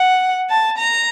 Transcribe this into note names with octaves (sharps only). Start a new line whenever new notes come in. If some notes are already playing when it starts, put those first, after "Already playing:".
Already playing: F#5
A5
A#5